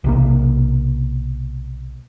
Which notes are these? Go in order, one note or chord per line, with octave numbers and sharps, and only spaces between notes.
B1 C3 A#3